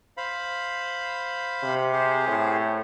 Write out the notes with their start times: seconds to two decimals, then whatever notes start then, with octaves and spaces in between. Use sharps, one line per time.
0.17 C5 F5 B5
1.63 C3
1.93 G4 G#4 C5
2.27 A2